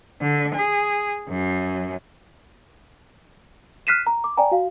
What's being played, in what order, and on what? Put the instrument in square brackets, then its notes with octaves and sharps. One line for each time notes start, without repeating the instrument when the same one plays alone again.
[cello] D3
G#4
F#2
[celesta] F6 F#6 B6 C7 D#7 E7
A#5
D6
D5 G5 G#5 A#5
F#4 F5